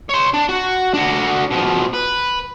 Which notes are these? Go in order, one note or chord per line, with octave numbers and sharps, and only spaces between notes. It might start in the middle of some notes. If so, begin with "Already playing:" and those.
C#5 C6
D4
F#4
D4 F#4
B2 F3
B4